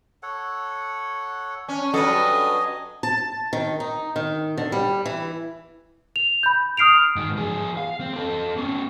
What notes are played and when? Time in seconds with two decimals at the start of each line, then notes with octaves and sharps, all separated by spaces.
0.23 A4 C#5 F#5
1.69 C#4 D4 G#5
1.94 G2 F#3 A4 B4 D#5
3.03 A5
3.53 D#3
3.80 D#4
4.16 D#3
4.57 D3
4.72 G3
5.06 E3
6.16 F7
6.43 B5 G6
6.77 D#6 F6 C7 D7 F7
7.16 G#2 D#3
7.37 F3 G#4
7.77 F5
8.01 C4
8.14 C4 A4
8.56 B3 C#4